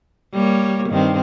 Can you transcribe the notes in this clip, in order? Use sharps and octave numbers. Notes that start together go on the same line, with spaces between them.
G3 A#3 C#5
G2 D#3 C4